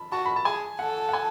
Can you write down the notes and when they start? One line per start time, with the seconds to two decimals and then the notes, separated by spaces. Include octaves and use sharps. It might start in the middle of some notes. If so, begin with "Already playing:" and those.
Already playing: A5 B5
0.12 F#4 A5
0.26 B5
0.36 A5
0.45 G#4 G#5
0.79 A4 F#5
1.09 F#5
1.13 G#5